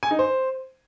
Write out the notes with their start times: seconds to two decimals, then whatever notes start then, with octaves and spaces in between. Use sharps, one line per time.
0.03 G#5
0.11 D#4
0.19 C5